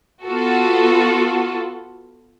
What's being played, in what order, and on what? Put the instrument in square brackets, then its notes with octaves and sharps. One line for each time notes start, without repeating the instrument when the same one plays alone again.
[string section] B3 F4 F#4 A4